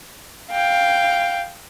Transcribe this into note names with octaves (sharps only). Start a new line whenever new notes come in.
F5 G5